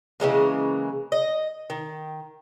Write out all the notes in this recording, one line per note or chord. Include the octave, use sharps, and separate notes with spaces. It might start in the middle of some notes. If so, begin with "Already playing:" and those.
C#3 E3 G#3 A#3
D#5
D#3